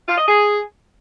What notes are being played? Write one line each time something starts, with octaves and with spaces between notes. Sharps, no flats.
F4
D#5
G#4